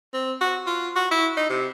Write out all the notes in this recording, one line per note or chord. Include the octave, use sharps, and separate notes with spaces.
C4
F#4
F4
F#4
E4
D#4
C3